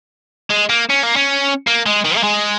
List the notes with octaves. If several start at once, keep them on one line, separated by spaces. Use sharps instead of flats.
G#3
A#3
C#4
A#3
C#4
A#3
G#3
D#3
A#3
G#3